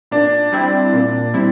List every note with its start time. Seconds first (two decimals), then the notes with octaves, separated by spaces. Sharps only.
0.11 A#2 D4
0.52 G3 C4 E4
0.93 A#2
1.34 G3 C4 E4